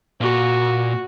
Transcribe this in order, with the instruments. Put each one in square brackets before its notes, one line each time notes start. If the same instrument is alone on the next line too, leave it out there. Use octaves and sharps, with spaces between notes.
[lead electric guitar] A#2 [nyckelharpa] F#4